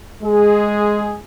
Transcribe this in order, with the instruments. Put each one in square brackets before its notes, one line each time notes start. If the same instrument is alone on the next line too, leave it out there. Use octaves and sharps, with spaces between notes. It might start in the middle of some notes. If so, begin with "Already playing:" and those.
[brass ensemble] G#3 G#4